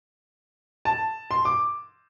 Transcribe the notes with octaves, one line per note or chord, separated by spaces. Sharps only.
A5
C6
D6